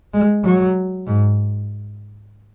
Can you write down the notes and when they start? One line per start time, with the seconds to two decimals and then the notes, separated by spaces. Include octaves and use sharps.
0.13 G#3
0.44 F#3
1.07 G#2